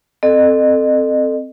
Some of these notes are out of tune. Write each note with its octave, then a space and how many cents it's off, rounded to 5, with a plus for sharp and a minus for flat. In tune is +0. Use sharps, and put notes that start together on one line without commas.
C4 +0 A4 +0 D#5 -35